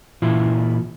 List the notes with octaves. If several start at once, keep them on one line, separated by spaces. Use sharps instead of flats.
A#2 E3 E4 F4